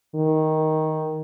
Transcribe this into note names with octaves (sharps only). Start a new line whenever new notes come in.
D#3